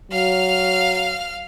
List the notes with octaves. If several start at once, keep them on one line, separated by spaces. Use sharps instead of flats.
F#3 F5 F6